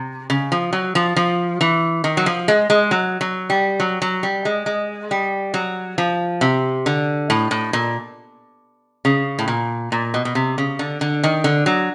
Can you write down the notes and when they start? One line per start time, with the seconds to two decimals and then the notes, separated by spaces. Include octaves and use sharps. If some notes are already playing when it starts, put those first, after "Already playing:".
Already playing: C3
0.30 C#3
0.52 F3
0.73 F#3
0.95 F3
1.16 F3
1.61 E3
2.04 D#3
2.17 F#3
2.26 F3
2.48 G#3
2.70 G#3
2.91 F#3
3.21 F#3
3.50 G3
3.80 F#3
4.02 F#3
4.23 G3
4.45 G#3
4.66 G#3
5.11 G3
5.54 F#3
5.98 F3
6.41 C3
6.86 D3
7.30 A2
7.51 A2
7.73 A#2
9.05 C#3
9.39 A2
9.48 A#2
9.92 A#2
10.14 B2
10.25 B2
10.35 C3
10.58 C#3
10.79 D3
11.01 D3
11.23 D#3
11.44 D3
11.66 F#3